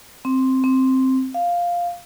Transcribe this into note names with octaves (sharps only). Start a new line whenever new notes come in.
C4
C4
F5